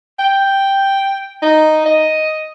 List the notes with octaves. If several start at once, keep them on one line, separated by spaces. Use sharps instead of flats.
G5
D#4
D#5